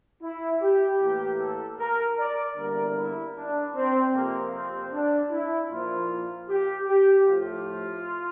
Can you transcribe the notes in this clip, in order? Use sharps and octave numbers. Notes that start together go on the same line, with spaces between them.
E4
G4
A2 E3 A#3 G4
A4
A#4
D5
E2 D3 G3 A#3 A#4
E4
D4
C4
F2 C3 F3 A#3
C4
D4
E4
A#2 F3 A#3 F4
G4
G4
A2 F3 A3 F4